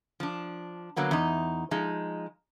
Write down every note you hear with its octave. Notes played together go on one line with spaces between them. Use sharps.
F3 D4
D3 F#3 A#3 B3
E2 D#4
F3 G#3 D#4